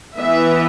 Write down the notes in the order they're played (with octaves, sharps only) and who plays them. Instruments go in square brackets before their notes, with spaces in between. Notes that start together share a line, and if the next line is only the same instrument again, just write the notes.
[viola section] E3 B3 E5